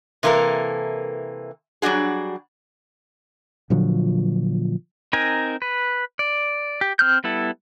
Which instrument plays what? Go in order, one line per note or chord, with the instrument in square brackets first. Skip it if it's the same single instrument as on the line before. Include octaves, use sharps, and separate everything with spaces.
[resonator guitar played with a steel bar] C3 E3 A#3 A4 A#4
F#3 G3 D4 F#4 G#4
[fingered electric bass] A#2 D3 F3 F#3
[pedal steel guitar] C4 D#4 A#4 G#5
B4
D5
G4
C4 F6 G6
G3 B3 E4 A4